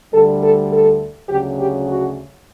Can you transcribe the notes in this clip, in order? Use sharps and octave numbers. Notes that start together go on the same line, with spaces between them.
D2 D3 G3 A4
A4
A4
D2 C#3 F#3 G4
G4
F#4